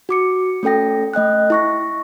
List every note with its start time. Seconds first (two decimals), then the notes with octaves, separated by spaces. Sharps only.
0.09 F#4 D6 C#7
0.63 A3 C#4 A4 G5 A#6
1.14 A3 D#5 G5 F#6
1.50 E4 C#6 A#6